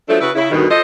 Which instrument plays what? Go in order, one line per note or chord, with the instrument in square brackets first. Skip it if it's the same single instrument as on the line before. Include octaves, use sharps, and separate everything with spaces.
[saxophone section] F3 F#3 A3 D4 A4
C#3 E4 F#4 B4
C#3 E4
D2 G2 B2 D#3
F3 A4 C5 D#5